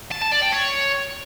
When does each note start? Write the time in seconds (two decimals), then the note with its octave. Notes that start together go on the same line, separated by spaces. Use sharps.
0.11 A5
0.22 A5
0.32 D5
0.42 G5
0.52 C#5